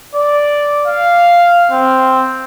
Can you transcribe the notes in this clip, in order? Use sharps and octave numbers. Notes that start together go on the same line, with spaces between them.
D5
F5
C4